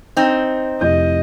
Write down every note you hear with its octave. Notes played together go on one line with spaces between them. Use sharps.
C4 D#4
F1 E4 D#5 G6